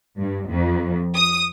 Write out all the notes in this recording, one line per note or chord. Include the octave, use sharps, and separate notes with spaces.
G2
F2
D#6